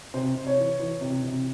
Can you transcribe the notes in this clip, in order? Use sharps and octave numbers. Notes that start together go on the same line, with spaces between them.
C3 C5
C3
C#5
E3
E3
C3
C3